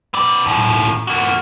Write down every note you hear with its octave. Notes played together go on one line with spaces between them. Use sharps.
B3 D5
D#2 A2
A#3 F#4